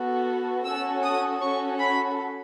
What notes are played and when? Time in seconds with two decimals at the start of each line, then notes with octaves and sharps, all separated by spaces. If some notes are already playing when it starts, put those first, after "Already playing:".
Already playing: B3 F#4 A4
0.65 C#4 F#4 A4 E6
1.04 D#6
1.41 C#4 F#4 A4 C#6
1.79 B5